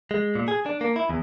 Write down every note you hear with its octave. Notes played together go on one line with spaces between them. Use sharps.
G#3
A#2
G#4
D4
A#3
E4
E2